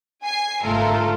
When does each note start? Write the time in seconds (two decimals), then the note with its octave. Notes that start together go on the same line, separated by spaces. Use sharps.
0.24 G#5 C7
0.63 G1 G#2 A3 F4 A4 A#4